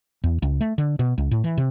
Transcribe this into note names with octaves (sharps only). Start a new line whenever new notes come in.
E2
C#2
A3
D3
B2
C#2
A2
E3
C3